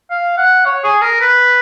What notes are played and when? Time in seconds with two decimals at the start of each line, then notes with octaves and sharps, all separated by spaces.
0.11 F5
0.38 F#5
0.65 C#5
0.84 G#4
1.02 A#4
1.20 B4